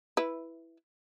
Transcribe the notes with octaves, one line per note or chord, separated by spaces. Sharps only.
E4 B4